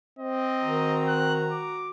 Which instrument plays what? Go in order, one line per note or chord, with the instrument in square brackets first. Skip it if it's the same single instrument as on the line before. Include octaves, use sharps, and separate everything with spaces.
[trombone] C4 [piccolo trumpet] D#5
[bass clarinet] D#3 [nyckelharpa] F#4 A#5
[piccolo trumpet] F#6
D6